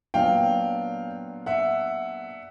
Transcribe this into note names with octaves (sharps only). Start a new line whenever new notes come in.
A#2 F#3 B3 D4 F5 G5
E5 F#5